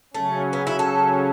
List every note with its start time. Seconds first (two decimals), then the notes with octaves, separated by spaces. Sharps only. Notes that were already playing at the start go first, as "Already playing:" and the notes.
0.14 C#3 F#3 A3 C#4
0.53 B3
0.67 E4
0.79 A4